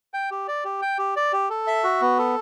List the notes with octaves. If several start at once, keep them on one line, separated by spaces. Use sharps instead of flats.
G5
G4
D5
G4
G5
G4
D5
G4
A4
E5
F#4
B3
A4